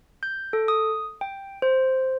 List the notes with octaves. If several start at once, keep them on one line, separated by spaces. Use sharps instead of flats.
G6
A4
D#6
G5
C5